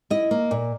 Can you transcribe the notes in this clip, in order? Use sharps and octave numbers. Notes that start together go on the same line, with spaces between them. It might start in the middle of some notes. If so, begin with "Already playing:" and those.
E4 D#5
A#3
A#2